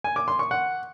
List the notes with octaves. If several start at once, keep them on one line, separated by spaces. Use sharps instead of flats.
G#5
D6
C6
C#6
F#5